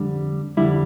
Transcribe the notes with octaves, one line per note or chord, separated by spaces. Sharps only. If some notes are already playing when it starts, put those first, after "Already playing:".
Already playing: F2 D3 G3
F2 D3 G3 E4